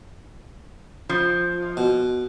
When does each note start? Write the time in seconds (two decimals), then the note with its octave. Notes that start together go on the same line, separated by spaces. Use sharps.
1.09 F3
1.77 B2